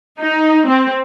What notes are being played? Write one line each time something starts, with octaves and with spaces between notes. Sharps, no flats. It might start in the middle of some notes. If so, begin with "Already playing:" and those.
D#4
C4